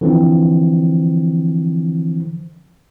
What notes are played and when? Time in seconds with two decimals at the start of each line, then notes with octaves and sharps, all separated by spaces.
0.01 D3 E3 F3 C4